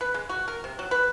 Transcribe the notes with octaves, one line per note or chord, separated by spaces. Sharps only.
B4
G#3
F#4
A#4
C3
F#3
B4